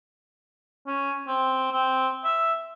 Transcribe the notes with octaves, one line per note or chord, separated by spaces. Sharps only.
C#4
C4
C4
E5